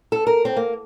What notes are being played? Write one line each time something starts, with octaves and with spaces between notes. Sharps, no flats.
A4
A#4
C4
A#3